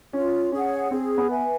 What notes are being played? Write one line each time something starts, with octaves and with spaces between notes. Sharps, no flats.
C#4 F4
C#4 G#4 C#5 F#5
C4 G#4
B3
B4 E5 G#5